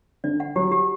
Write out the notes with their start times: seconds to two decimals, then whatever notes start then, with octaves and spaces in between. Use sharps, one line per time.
0.24 D3 D5
0.40 F#5
0.56 F#3 G4
0.72 G4